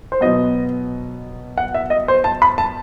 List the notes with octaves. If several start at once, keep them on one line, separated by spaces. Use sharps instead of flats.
C5
B2 F#3 B3 D#5
F#5
E5
D#5
C5
A5
B5
A5